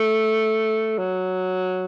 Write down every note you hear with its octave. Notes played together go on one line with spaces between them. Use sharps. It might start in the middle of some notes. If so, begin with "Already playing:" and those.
Already playing: A3
F#3